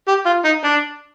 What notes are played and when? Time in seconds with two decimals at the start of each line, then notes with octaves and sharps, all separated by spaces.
0.08 G4
0.26 F4
0.45 D#4
0.64 D4